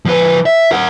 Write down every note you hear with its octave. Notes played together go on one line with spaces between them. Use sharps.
F3 B4
E5
A#4 F#5